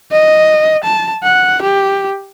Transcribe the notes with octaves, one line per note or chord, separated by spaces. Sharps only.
D#5
A5
F#5
G4